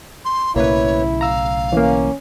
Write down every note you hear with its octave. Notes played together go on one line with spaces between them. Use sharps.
C6
B1 A2 C#3 A#3 E4 B4 C#5
F5 A#5 E6
E3 A#3 C#4